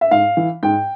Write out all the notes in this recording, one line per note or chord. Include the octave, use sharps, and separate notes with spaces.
E5
G#2 F5
E3
G#2 G5